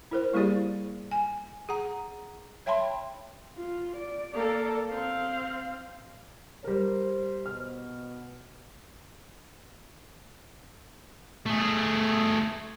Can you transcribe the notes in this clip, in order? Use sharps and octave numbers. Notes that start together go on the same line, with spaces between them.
E4 A#4 C5
G3 A#3 E4 G4 G#4 D5
G#5
G#4 F#5 A#5
C#5 E5 G5 A5 B5 C6
F4
D5
A#3 A4
C4 F5
G3 A#4 C5
B2 F6
A3 G#4